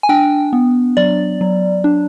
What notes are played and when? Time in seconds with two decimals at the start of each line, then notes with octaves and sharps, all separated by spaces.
0.03 G#5
0.09 D4 G5
0.53 B3
0.97 F#3 D5
1.41 F#3
1.84 D4